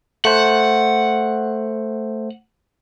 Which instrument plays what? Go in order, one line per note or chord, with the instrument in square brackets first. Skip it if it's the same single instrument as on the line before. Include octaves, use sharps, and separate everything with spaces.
[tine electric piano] A3 C5 [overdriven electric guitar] F#5